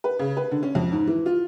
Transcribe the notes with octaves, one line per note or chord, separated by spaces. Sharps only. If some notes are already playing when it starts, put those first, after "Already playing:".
B4
C#3
B4
D3
C#4
F2
G#2
E3
F4